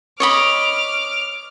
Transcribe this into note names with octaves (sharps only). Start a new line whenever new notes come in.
C#5 D#5 B5 D6 F6